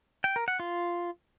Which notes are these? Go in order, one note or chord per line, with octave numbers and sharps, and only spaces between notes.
G5
A#4
F#5
F4